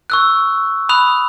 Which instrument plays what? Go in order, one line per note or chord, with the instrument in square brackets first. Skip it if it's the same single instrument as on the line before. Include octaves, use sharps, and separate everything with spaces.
[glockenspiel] C#6 E6 F#6
B5 D#6 F#6 F7